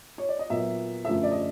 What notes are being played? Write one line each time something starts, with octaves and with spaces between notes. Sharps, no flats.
C#5
D5
D#5
A#2 F#3 B3 E5
F#2 D3 F3 A3 E5
D5
D#5